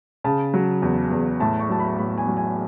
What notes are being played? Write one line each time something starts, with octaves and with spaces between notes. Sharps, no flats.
C#3 A5
F#3
E2
E2
A2 A5
C#6
F#3 A5
B5
A2 B5
G#5
F#3
G#5